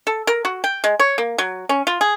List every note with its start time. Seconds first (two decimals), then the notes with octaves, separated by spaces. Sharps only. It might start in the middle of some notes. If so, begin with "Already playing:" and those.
0.07 A4
0.27 A#4
0.45 F#4
0.64 G5
0.84 G#3
1.00 C#5
1.18 A#3
1.38 F#3
1.69 C#4
1.87 F4
2.01 G#4